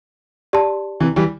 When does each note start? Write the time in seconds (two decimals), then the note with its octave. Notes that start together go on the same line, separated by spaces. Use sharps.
0.53 G4 D5 A5 C6
1.00 C3 E3
1.16 E3 G3